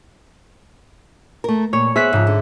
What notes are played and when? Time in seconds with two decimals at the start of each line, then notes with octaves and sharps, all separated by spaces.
1.44 A3 A#4
1.73 A#2 C#5
1.96 B3 G#4 C5 E5 F#6 B6
2.13 G#2 C#3 F3
2.27 D3